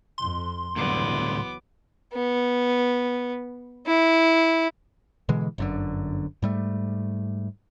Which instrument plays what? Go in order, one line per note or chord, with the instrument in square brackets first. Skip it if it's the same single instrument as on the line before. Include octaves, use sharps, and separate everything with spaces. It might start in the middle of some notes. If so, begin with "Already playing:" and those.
[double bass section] F2 [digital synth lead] C6
[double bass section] C#2 E3 F#3 [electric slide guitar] A2 D3 G3 [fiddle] B3 D6
[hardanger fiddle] B3
E4
[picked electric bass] B2 D3 E3 G#3
G1 F#2 D3
G#2 G3 A3